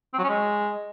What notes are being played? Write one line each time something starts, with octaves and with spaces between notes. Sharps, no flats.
C4
F#3
C#4
G#3